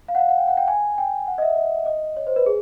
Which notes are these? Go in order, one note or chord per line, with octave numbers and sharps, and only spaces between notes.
F5
F#5
F5
F#5
G5
F#5
G5
G#5
G5
F#5
D#5
E5
E5
D#5
C#5
C5
B4
G#4